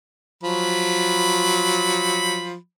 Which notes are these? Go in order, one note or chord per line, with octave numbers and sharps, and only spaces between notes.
F3 F#3 B5